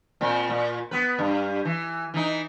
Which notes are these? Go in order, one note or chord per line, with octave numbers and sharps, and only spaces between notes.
A#2 C4
A#2
B3 B4
G2
E3
E3 D#4